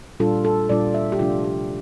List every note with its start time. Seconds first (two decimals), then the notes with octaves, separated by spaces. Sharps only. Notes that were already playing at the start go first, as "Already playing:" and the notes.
0.20 A#2 G3 D4 F4 A4
0.45 A4
0.69 A#2 G3 D4 F4 D5
0.94 E5
1.12 G4
1.19 C3 F3 A3 D4 F4
1.44 G4